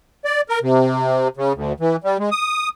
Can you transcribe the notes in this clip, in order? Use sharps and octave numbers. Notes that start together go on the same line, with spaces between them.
D5
A#4
C3
C#3
D2
E3
G3
G#3
D#6